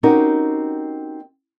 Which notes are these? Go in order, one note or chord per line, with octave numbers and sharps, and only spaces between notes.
C4 C#4 D#4 F#4 G4 A#4